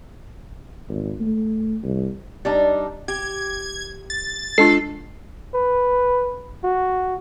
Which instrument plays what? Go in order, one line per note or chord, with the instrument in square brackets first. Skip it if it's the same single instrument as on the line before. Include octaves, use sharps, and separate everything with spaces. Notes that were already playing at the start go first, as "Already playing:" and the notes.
[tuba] G#1
A3
C2
[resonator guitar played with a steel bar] G3 D4 D#4
[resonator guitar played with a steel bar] G4 [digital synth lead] G#6
[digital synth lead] A6
[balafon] G#3 D4 F4 [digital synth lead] A4 [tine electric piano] C7
[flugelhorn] B4
F#4